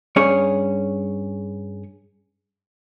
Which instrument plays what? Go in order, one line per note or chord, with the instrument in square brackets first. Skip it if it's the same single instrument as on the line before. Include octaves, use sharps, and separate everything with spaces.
[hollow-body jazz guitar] G2 C#4 G#4 C#5